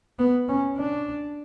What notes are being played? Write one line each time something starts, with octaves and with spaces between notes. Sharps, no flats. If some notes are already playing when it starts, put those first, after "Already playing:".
B3
C#4
D4